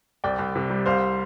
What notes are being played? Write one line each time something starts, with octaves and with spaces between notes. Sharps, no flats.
C2 D5 G5
C2
C3
G3
C2 C5 F5